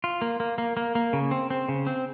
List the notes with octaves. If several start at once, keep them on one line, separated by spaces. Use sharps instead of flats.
F4
A#3
A#3
A#3
A#3
A#3
C#3
C4
C4
C#3
C4